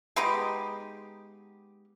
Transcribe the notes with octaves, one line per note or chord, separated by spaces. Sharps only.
G#3 B3 D#4 G4